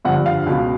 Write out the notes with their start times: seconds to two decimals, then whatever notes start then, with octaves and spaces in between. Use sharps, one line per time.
0.05 G2 D3 F3 F#5
0.26 F5
0.46 C#2 B2